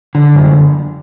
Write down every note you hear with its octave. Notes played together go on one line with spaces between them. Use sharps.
D3
F#2